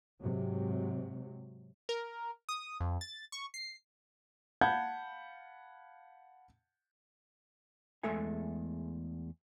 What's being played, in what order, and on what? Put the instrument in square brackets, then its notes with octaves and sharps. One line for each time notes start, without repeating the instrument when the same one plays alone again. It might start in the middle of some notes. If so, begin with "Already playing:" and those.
[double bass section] G#2 C3 F#3
[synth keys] A#4
D#6
F2
A6
C#6
C7
[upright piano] F5 F#5 A5 B5 G6 G#6
[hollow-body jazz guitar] E2 G#3 A3 A4 E5 G#5